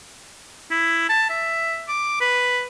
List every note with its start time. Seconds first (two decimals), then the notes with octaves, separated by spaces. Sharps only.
0.71 E4
1.09 A5
1.30 E5
1.88 D6
2.21 B4